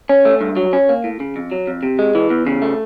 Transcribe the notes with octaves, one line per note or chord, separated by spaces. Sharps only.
C#4
A3
G2
F#3
C#4
A#3
A2
C#3
F2
F#3
F2
C3
G#3
E3
E2
C#3
A3